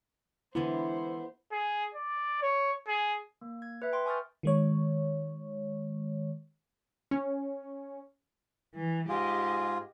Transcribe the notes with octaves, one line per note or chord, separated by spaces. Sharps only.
D3 E3 G#3 B3 E4 C5
G#4
D5
C#5
G#4
A#3
G#6
B4 E5
G5 C6
G#5 C#6 D#6 F6 G6 A6
D#3 G#3 C#5
C#4
E3
G#2 F4 G4 G#4 D#5